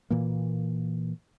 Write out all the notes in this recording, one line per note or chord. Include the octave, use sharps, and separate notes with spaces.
A#2 E3 A#3